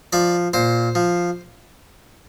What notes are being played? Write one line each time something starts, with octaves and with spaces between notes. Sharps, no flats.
F3 D5
A#2 C5
F3